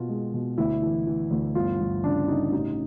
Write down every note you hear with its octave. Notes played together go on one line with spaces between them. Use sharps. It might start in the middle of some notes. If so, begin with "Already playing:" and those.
Already playing: B2 A#3 B3 F4
G#3
B2
D2 E4
E3
E3
D2
G1 F4
G1
C#3 D4
C#3 D#4
A1 D#4